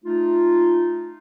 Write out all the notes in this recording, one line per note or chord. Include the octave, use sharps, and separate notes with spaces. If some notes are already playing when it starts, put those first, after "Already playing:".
A3 D#4 F4